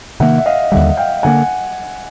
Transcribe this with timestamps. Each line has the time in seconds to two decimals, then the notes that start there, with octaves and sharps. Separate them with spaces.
0.20 C3 D#3 G3 A#3 E5 F#5
0.38 E5
0.46 D#5 F5
0.72 D#2 D3 G3 E5 F#5
0.97 F5 G5
1.23 D3 F#3 A#3 F#5 G#5